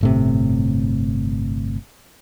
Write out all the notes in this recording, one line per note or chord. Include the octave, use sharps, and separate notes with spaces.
G1 A2 C3